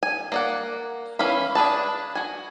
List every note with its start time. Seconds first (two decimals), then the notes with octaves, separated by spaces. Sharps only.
0.03 G#5
0.32 A#3 D5 F#5
1.19 E3 C#4 F5 B5
1.55 D4 G#4 B4 A5
2.15 F#4 G#5